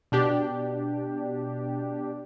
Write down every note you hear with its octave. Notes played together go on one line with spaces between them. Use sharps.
B2 D4 G4